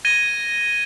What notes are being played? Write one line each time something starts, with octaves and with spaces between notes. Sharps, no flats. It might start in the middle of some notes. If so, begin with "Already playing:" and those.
G#6 A#6 D#7 G7